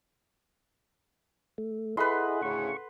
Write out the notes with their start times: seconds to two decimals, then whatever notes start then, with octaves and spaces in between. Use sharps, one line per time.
1.58 A3
1.97 E4 G#4 A4 B4 D#5 F#5 B5 C6
2.42 D2 A2 C#3 C#6